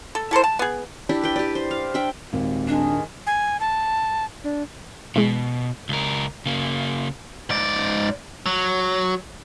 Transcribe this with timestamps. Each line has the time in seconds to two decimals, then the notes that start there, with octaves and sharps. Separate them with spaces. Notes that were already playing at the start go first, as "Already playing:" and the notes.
0.15 A4
0.31 E4 A4 A#4 C5
0.44 A5
0.59 B3 G#4
1.09 D4 E4 G4
1.23 B4 G5
1.36 G4 D5
1.55 C5
1.71 F5
1.94 D4 E5 G5
2.33 G#1 D#2 A#2
2.67 D#3 G#3 D4
3.27 G#5
3.60 A5
4.44 D4
5.16 B2 E3 G#3
5.89 C#2 A#4
6.46 C#3 A#3
7.50 G#2 D5
8.46 F#3